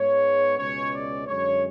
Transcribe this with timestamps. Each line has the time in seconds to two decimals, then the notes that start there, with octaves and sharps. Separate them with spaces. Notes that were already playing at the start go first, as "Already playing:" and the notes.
Already playing: G#2 G#3 B3 C#5
0.58 C#2 B2 G#3 C#4 C#5
0.92 D5
1.26 F#2 D3 G#3 C#5